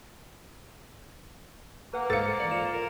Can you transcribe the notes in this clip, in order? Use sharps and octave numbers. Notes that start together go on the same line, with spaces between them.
A#3 B4 F#5
G#2 A4 C5 F5 A6 C#7
E2 G2 D5
F4 E7
A#4